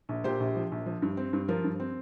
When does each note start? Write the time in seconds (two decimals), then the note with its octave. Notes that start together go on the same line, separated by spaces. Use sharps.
0.09 A#1
0.24 A#2 G4 C5
0.40 A#1
0.56 F3
0.72 A#1
0.86 F3
1.02 G2
1.17 C4
1.33 G2
1.48 F3 F4 A#4
1.64 G2
1.80 C4